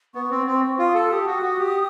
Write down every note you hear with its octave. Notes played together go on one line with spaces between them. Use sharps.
B3 C#6
C4
C4
C#6
F4 D6
D#6
A4 E6
G4 D#6
F#4
F#4
G4